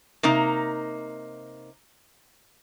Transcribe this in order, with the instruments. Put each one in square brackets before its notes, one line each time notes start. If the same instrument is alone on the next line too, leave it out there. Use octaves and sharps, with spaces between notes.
[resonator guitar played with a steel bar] C3 A#3 D#4